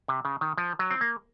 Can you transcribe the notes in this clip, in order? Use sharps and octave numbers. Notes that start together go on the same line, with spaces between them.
C3
C#3
D#3
F3
F#3
C4
A#3